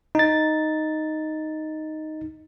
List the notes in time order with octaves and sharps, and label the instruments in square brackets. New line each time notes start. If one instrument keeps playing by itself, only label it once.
[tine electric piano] D#4 A6